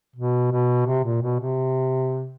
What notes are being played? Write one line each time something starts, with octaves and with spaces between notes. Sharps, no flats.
B2
B2
C3
A#2
B2
C3